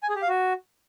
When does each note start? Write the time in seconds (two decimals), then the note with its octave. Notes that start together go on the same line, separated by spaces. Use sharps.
0.03 G#5
0.09 G#4
0.16 G4
0.22 F5
0.28 F#4